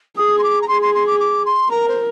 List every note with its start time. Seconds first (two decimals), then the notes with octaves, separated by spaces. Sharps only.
0.17 G#4 D#6
0.38 C6
0.43 D6
0.61 A#5
0.67 G#4 C6
0.81 C6
0.94 C6
1.06 D6
1.19 D6
1.45 C6
1.70 A#4 A#5
1.88 C5